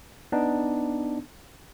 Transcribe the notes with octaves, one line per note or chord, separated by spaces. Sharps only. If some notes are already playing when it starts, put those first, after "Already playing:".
B3 D4 D#4